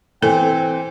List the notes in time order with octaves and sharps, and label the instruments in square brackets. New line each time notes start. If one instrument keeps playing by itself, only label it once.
[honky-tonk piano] E3 [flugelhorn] C4 [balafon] A4 [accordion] G5